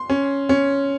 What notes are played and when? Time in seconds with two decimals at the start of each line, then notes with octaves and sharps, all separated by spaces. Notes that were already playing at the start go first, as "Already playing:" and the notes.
Already playing: C6
0.10 C#4
0.49 C#4